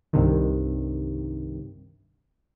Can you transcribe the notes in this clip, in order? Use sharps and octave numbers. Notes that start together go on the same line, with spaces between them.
C2 G2 C3 D#3